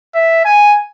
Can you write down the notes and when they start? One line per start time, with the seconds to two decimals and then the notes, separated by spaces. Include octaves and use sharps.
0.14 E5
0.45 G#5